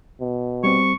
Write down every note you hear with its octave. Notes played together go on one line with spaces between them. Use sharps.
B2
G3 C4 C#6